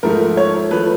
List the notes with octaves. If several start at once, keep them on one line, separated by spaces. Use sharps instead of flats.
G#2 F3 A3 A#4
C#5
F3 A3 B4